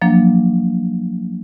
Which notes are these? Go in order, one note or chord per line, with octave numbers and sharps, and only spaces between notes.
F3 F#3 A#3 D4